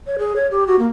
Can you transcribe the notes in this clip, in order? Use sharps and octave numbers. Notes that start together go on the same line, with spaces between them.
C#5
G#4
C#5
G4
F#4
A#3